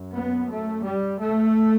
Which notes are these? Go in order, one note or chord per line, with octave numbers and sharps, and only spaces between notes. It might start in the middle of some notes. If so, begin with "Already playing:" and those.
Already playing: F#2
B3
A3
G3
A3